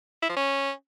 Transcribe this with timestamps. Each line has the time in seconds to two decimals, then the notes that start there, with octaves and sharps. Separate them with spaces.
0.22 E4
0.29 F3
0.36 C#4